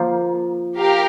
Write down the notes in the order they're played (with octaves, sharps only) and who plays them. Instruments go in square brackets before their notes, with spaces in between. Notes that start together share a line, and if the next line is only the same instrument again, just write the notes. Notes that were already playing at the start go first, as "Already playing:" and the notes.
Already playing: [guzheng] F3 A#3
[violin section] G4 A#4 F5